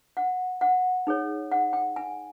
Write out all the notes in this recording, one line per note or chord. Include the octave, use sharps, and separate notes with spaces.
F#5
F#5
D#4 G#4 C#5
F#5
G5
G#5